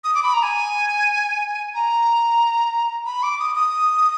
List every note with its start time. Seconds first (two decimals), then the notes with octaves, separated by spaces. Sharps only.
0.04 D#6
0.15 D6
0.23 B5
0.34 A#5
0.43 G#5
1.74 A#5
3.06 B5
3.23 D6
3.40 D#6
3.56 D#6